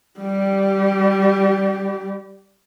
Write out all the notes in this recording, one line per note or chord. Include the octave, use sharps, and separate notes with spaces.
G3 G4